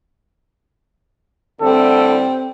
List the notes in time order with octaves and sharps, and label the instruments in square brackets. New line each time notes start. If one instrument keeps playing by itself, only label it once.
[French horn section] A2 D3 G3 [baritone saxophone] C4 [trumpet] A4